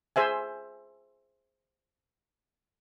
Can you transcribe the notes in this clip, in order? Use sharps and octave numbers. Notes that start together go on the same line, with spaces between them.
G#4 C5 E5 G#5